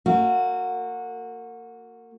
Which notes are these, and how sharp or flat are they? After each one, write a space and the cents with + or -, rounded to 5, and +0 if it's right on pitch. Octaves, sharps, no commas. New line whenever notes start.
A#3 -30 F#4 -20